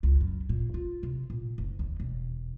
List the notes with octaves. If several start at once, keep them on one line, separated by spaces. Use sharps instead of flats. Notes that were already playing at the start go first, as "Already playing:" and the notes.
C#2
F#2
A#2
F4
C3
A#2
F#1
D#2
E1